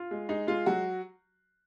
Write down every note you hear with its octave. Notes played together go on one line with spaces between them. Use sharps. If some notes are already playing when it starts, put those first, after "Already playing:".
Already playing: F4
G#3
G#3 D#4
G#3 F4
F#3 F#4